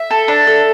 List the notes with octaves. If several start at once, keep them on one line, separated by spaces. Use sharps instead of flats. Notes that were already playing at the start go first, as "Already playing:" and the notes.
Already playing: E5
A4
D4
A4